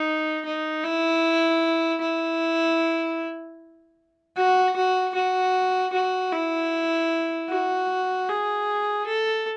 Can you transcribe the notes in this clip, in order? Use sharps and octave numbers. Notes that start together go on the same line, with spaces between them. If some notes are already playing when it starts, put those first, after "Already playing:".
Already playing: D#4
D#4
E4
E4
F#4
F#4
F#4
F#4
E4
F#4
G#4
A4